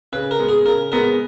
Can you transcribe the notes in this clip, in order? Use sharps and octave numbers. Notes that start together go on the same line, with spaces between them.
C#3 B4
A#4
G#3 B3
G#4
C#3 A#4
G#3 B3 A#4